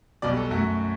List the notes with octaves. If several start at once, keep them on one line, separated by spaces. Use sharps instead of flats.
B1 B2 G3 D5
A4
F#2 F#3 A3 F#4